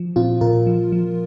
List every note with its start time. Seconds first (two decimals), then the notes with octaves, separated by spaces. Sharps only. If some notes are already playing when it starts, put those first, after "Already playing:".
Already playing: F3
0.16 A#2 C4 F4
0.41 A#2 F4 A#4
0.67 F3
0.92 F3